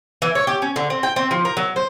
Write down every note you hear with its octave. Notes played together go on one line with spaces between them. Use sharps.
E3
C#5
G4
C#4
D3
C4
G5
C4
F3
A#4
F#3
C5